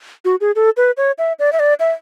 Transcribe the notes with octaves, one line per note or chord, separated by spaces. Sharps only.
F#4
G#4
A4
B4
C#5
E5
D5
E5
D5
E5